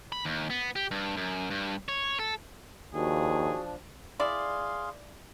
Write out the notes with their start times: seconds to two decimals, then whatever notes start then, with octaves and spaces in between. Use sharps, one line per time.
0.12 B5
0.25 D#2
0.50 B3
0.76 G4
0.91 G2
1.17 F#2
1.50 G2
1.88 C#5
2.19 A4
2.94 D#2 F3 D4 F#4 G#4
4.20 E4 G#4 D5 F5 C6